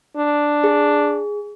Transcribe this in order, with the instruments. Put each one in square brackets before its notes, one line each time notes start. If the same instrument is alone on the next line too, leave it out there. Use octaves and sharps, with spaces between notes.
[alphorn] D4
[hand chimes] G#4